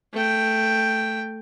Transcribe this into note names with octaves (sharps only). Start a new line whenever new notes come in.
A3 G5